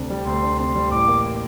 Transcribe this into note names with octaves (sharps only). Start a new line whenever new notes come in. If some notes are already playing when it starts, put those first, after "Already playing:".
Already playing: D2 C3 D4
G3
D2 C6
D4
C3 C6
G3
A1 D6
A#3